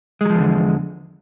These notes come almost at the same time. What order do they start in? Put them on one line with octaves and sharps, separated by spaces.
G#3 F#3 F3 E2 D3